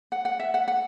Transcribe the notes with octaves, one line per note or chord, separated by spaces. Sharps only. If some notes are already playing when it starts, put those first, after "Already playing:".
F#5
F#5
E5
F#5
F#5